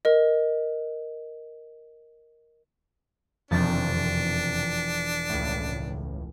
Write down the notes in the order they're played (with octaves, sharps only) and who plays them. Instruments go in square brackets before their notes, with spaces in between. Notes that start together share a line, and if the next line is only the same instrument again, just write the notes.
[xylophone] A#4 D#5
[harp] E1 F3 A6 [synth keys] F2 C3 D#3 [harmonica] D4
[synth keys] C#2 A2